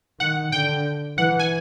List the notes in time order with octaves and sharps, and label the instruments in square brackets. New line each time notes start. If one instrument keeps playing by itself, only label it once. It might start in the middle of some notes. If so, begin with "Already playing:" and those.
[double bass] D#3 [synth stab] F#5
[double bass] D3 [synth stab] G5
[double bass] E3 [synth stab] F#5
[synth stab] G#5